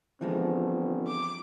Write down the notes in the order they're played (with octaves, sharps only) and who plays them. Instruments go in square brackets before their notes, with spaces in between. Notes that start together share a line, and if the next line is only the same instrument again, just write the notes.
[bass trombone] G1 [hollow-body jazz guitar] E3 F3 G#3 [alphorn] C4
[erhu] D6